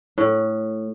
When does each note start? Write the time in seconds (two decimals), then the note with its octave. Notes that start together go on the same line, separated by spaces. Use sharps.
0.18 A2